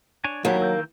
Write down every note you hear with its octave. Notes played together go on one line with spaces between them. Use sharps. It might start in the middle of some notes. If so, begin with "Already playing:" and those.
D4 C#5 G#5
D#2 F#3 A#3 B3 E4 G4
D#3 E6 G6